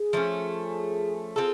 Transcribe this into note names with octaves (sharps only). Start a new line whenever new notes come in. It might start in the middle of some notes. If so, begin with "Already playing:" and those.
Already playing: G#4
F3 A3 C#4
C4 F4 G#4 A4